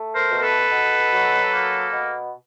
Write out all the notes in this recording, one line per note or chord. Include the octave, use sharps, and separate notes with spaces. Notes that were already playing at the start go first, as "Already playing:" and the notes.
Already playing: A3
A#4 C5
B2
A#4
A4 B4
B2
F#3
A#3
B2